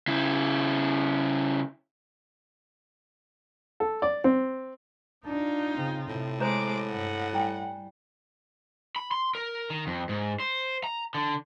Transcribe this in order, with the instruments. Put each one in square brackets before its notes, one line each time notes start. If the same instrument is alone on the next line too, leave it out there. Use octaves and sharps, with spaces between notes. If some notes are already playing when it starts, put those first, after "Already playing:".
[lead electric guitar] C#3 E4
[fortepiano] A4
D5
C4
[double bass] D4 [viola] D#4 F4
[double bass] C#3 C4
[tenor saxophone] A2 [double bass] C3
[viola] G#3 D6 [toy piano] C5 C#5 A#5
[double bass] G2 [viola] F#5
[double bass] G3 [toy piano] E4 G5 G#5
[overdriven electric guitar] B5
C6
A#4
D#3
F2
G#2
C5
A#5
D3